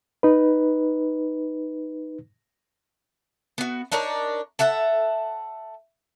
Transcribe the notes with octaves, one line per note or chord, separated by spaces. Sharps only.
D#4 B4
B3 F#4
D4 D#4 A#4 C#5
A4 E5 F#5 A5